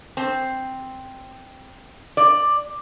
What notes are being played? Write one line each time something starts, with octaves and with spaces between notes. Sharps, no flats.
C4
D5